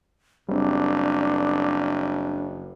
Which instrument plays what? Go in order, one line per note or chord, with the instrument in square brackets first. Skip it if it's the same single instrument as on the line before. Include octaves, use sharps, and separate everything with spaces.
[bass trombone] F#1 [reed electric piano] G3 C4 [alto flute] D4